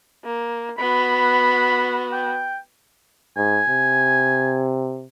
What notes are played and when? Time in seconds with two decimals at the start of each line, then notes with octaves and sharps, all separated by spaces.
0.24 A#3
0.79 B3 F#4 B5
2.13 G5
3.37 G#2 G#5
3.69 C3